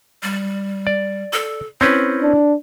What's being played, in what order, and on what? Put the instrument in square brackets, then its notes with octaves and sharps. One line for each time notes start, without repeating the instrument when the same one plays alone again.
[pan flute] G3
[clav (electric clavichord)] D5
[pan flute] A4
[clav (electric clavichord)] C4 C#4 B4 [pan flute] E4
[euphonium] D4